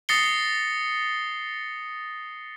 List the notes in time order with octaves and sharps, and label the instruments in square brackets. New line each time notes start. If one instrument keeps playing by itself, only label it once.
[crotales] D#6 A6 A#6 C7 C#7 G7